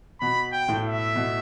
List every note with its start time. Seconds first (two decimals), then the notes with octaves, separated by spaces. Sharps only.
0.20 B2 B5
0.52 G5
0.68 A2
0.84 E5
1.16 B2